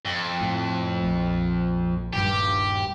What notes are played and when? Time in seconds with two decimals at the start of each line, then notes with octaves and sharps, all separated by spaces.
0.05 F2
0.41 A2
1.02 A#1
2.13 D#1 G2 G3 G4